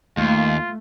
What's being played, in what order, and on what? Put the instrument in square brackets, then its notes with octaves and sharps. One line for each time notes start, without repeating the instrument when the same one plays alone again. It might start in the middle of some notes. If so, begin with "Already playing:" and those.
[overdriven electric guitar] D#2 [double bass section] A3 [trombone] F4